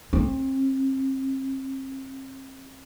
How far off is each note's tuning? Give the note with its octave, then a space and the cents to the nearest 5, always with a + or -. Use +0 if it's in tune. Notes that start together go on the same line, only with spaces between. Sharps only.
C4 +35